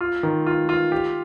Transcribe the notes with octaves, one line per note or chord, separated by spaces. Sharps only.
F4
D#3
F4
F4
G4